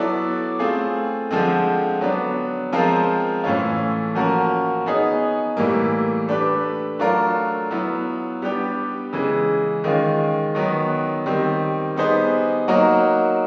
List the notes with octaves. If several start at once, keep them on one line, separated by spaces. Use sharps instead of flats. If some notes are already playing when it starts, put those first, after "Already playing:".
Already playing: F#3 B3 E4 A4 D5
A3 C4 F4 G#4
D3 F3 G#3 C4
F#3 B3 D4
F3 G#3 C4 F4 A#4
A2 E3 A3 C#4 F4
F3 A#3 C#4 F#4 A#4
B3 D#4 G#4 C#5
A2 E3 G3 A#3
A3 D4 G4 B4
F#3 A3 D4 F4 A#4
F#3 B3 E4
G3 B3 D4 G4
C#3 E3 G#3
D#3 G#3 C#4 F4
D#3 F#3 B3
D#3 G3 C4
G3 B3 D#4 G#4 C5
F#3 A#3 D#4 F#4 A#4